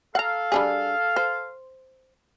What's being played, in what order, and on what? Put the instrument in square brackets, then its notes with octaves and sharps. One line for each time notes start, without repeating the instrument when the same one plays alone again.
[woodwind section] A4 F5 [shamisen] F#5 A#5
[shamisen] G3 D4 G#4
C5